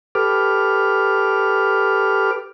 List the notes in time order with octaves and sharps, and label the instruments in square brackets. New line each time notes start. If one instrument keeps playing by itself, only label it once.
[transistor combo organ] G4 A4 B4 D6 F6